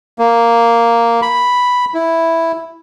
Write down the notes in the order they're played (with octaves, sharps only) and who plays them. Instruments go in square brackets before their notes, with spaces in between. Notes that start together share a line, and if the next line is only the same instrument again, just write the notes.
[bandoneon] A#3
B5
E4